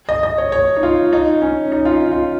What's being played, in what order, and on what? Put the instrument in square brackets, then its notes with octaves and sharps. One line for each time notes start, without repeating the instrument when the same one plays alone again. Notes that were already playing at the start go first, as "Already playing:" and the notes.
[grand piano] D#5
D#5
C#5
C#5
D#4
F4
D#4
C#4
D#4
F4
D#4
F4